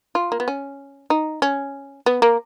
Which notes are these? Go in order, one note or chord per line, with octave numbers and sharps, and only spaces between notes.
F4
A#3
B3
C#4
D#4
C#4
B3
A#3